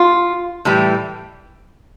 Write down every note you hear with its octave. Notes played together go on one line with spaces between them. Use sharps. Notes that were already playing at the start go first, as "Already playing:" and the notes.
Already playing: F4
A2 E3 G3